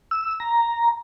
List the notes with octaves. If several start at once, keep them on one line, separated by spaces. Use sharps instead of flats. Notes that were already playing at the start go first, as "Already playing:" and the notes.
E6
A#5